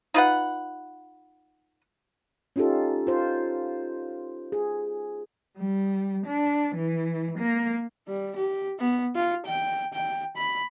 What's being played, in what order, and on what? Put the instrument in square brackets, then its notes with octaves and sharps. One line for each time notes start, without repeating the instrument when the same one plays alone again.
[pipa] D#4 F4 B4 F#5
[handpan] C#4 D#4 F4 G4 A4
F4 C5
G#4
[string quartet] G3
D4
E3
A#3
[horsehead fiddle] G3
G4
B3
F4
G5
G5
B5